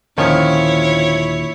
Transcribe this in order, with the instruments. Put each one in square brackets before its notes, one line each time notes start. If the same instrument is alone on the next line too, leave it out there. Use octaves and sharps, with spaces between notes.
[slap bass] D#2 A#2 D3 [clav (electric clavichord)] D#3 F3 C#4 [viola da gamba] E4 C#5